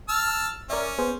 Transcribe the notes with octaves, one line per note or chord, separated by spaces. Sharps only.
A5 E6 F6
C#4 A#4 D5 E5
B3 G#4 C5